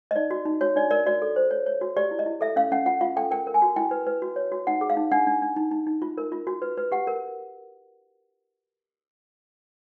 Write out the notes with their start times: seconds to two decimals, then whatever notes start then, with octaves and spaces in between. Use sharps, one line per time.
0.11 D#5
0.16 D#4 D5
0.31 F#4
0.45 D#4
0.61 F#4 C#5
0.76 D4 D5
0.91 A#4 D5
1.06 F#4 D5
1.22 A4
1.36 C5
1.51 C#5
1.66 C#5
1.81 F#4
1.96 G4 D5
2.11 E4
2.19 D#5
2.26 E4
2.41 A4 E5
2.56 C#4 F5
2.72 C#4 F#5
2.86 F4 F#5
3.01 F4 F5
3.16 A4 G5
3.31 A#4 G5
3.47 A#4
3.54 G#5
3.62 F#4
3.76 E4 G5
3.91 B4
4.07 B4
4.22 F#4
4.36 C#5
4.52 F#4
4.67 D#4 F#5
4.81 G#4
4.90 F5
4.97 D#4
5.11 D4 F#5
5.27 D4
5.42 D4
5.56 D#4
5.71 D#4
5.87 D#4
6.02 F4
6.18 A#4
6.32 F4
6.47 F#4
6.62 B4
6.77 B4
6.92 G4 F#5
7.07 A#4